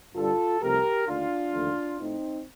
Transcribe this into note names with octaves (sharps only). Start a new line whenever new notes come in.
G2 D3 G3 F4 A4
C2 C3 F3 A3 G4 A#4
D#2 D3 A3 D4 F4
D#2 D3 F3 A3
A2 A3 C4 D#4